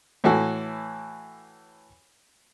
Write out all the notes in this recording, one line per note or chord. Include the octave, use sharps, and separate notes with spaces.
A2 E3 F#4 A4